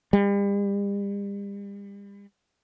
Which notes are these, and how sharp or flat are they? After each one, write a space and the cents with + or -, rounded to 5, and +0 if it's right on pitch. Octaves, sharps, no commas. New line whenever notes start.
G3 +40